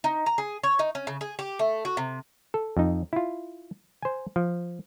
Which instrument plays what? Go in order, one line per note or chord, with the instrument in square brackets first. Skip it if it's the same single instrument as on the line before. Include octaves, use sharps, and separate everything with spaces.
[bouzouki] D#4
A#5
G#4
C#5
D#4
C#4
C#3
G#4
G4
A3
F#4
C3
[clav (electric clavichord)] A4
F2 D#4
E4 F4
C5 G#5
F3